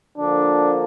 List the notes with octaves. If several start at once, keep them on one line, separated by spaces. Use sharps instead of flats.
D3 F3 A#3 D4